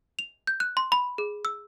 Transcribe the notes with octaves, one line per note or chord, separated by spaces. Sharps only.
F7
G6
F#6
C6
B5
G#4
E6